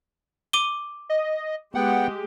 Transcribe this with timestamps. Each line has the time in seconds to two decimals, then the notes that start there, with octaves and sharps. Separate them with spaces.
0.53 D6 D#7 G7
1.09 D#5
1.75 G#3 B3 G4 F#5 G5